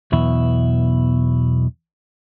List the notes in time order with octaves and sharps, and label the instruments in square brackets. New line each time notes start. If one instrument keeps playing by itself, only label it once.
[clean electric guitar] B1 E2 B2 E4